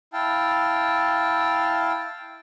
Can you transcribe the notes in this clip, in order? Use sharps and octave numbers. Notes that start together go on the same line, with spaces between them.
E4 F5 G5 A5